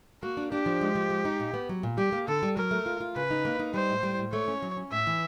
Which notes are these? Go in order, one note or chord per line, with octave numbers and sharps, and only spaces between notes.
A#3 F#4
D4
D4 G4
F3
G#3
F3
G#3
D#4
A#2
B3
F#3
A#2
G3 G4
A#3
D3 A4
G3
F#3 A#4
A3
F4
F4
C#3 B4
D#4
A#3
D#4
G3 C5
A2
G3
A2
A3 C#5
C#4
F#3
C#4
A2 E5
E3